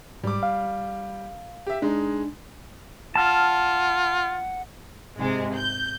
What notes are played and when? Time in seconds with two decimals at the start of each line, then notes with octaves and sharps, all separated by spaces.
0.24 G#2 G3 D6
0.43 F5
1.67 G4 E5
1.82 G#3 D4 D#4
3.15 F4 F#5 A5 F6
5.18 G#2 C3 G#3
5.55 G6